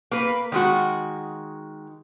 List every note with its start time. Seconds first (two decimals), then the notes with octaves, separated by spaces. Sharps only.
0.11 A#3 B4
0.52 D#3 G#3 F#4